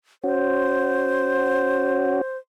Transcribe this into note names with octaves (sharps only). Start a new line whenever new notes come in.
C#4 F#4 C5